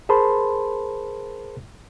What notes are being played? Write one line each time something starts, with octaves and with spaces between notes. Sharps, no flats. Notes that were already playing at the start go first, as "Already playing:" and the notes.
G#4 A#4 C5 A5 B5 C6